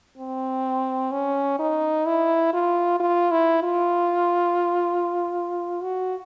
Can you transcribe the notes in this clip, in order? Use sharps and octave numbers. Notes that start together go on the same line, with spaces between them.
C4
C#4
D#4
E4
F4
F4
E4
F4
F#4